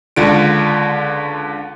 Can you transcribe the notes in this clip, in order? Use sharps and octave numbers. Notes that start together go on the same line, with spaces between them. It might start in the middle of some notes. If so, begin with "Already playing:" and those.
C#2 D3 F4 D7